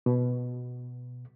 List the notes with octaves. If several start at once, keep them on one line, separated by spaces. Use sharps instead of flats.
B2